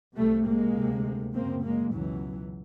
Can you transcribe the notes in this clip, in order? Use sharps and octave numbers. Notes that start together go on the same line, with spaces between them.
C2 C3 G3 A3
G#3 A#3
D2 C3
F#2 C#3 A#3 C4
G#3 A#3
C#2 B2 E3 F#3